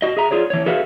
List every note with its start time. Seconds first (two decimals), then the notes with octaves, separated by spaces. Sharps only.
0.02 F#4 D#5
0.17 G#4 E5 A#5
0.31 F4 G#4 C#5 D5
0.50 E3 C#5
0.66 F#4 G#4 A4 B4 E5 F5